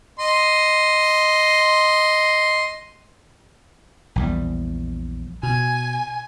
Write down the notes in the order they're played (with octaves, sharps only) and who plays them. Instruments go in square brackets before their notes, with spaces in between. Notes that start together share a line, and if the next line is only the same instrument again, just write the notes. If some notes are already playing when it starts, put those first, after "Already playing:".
[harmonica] D#5 C6
[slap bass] A#1 E2 G3
[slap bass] B2 [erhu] G#5